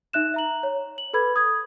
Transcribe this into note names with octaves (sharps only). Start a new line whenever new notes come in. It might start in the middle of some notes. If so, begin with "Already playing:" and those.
D#4 E5 F#6 E7
E5 A#5 F#7
C#5
F#7
A4 B4 B5 G#6
D#6 G#6